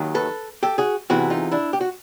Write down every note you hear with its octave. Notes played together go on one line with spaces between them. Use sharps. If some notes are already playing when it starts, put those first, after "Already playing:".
Already playing: D#2 D#3 F#3
A4 B4
G4 A4
F#4 G#4
E2 C3 E3 E4 F#4
D#4 F4
D4 E4
G4
F#4